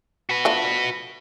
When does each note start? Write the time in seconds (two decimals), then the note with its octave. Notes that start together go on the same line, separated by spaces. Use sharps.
0.30 F#4 B4
0.45 F3 A3 D4